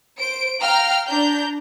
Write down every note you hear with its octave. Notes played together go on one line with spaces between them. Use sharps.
C5 D7
F5 G5 A#5 F6
D4 A#5 G6